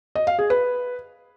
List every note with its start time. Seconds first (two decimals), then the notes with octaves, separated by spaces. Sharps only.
0.15 D#5
0.27 F5
0.39 G#4
0.50 B4